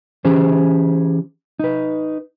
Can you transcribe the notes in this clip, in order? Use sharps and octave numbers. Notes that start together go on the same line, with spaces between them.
E3 C#4 G4 G#4 C5
D#4 B4